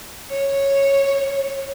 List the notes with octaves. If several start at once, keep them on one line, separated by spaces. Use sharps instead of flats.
C#5